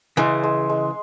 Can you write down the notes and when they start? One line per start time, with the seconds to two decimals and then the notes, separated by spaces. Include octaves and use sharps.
0.17 C#3 E3 G#3
0.43 G#3
0.69 G#3